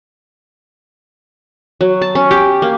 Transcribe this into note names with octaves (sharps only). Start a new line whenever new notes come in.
F#3
A5
C#4
G4
A#3